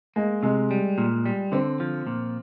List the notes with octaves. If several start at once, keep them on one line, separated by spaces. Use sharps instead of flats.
G#3 A#3
C3 G#3
G3
A#2
G3
D3 C4
F3
A#2